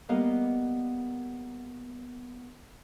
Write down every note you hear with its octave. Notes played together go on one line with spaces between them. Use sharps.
G3 A#3 B3 A#4 D#5 F5